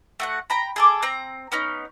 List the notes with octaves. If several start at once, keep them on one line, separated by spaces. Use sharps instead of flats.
A3 F#4 F#5
G5 A#5 B5
G#4 A4 D6
C4 A#5
B3 C#4 D#4